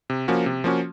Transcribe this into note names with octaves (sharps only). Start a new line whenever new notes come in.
C3
F3 A#3 C#4 F#4
C3
F3 A#3 C#4 F#4